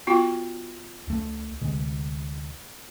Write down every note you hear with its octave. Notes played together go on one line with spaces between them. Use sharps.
B3 F4 F#4
C#2 A3
D2 C3 G#3